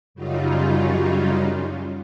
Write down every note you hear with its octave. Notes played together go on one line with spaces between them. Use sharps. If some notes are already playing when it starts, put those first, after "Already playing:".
F#2 C#3 F#3 G3 D#4 F4